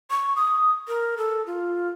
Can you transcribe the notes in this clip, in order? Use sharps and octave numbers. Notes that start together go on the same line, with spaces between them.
C#6
D#6
A#4
A4
F4